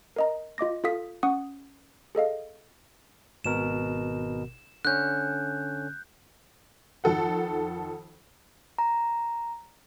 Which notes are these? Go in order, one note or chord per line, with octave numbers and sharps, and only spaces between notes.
A#4 D#5 A#5
F4 D#5 D6 A#6
F4 A4 F5 D#6 B6
C#4 F#5 C#6 D#6
G#4 A4 D#5 F5
G#1 B2 A#4 E7
D3 C#4 F#6 G6
F2 D#3 A4 F#5
A#5